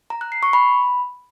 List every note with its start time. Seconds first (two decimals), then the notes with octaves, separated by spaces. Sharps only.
0.10 A#5
0.21 F#6
0.32 C7
0.43 C#6
0.53 B5